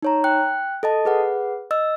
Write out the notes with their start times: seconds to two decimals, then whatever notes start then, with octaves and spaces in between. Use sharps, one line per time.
0.03 D#4 C#5 A#5
0.24 G5 F#6
0.83 A4 D#5 A5
1.05 G#4 B4 F#5
1.71 D#5 E6